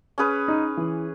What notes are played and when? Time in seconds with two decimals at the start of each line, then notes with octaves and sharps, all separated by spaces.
0.18 C#4 G#4 B4
0.48 D#4
0.77 E3